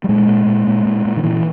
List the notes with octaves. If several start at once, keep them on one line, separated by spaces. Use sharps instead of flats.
G3
A#2 G#3
A#2
A#2
A#2
A#2
A#2
D#3
A#2 E3